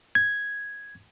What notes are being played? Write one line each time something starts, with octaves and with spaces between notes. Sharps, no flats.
G#6